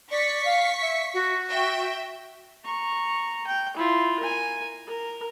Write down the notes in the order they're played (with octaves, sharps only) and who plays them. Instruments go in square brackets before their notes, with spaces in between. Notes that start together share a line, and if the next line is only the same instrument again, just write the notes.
[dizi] D5 [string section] C#6 B6 C#7
[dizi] F5
E5
F#4
[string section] E5 G5
[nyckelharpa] A#5 C#6
G5
E4 F4
A#4 G#5
A#4